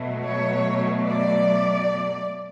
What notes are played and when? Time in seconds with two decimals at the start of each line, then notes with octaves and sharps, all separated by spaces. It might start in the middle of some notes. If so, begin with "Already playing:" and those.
Already playing: B2 F#3 A3
0.23 C#5
1.05 D5